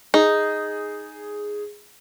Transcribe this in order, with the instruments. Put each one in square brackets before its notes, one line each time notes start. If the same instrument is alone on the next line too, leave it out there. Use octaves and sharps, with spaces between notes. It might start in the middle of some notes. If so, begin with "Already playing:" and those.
[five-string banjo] D#4 [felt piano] G#4